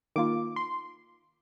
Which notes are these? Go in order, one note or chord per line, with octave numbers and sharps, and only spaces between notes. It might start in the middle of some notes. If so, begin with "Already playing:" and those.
D#3 A#3 F4 D6
C6